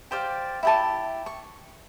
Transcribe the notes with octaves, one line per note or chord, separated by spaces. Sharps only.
G4 C5 D5 F5
E4 G4 A5
C#6